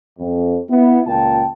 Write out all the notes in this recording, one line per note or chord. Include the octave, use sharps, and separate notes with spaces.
F2
B3 E4
C#2 A#2 F4 G5 A5